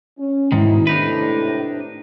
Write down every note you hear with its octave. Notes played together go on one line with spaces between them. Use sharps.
C#4
G#2 B2 D#3 D#4 E4
A2 C3 D4 D#4 B4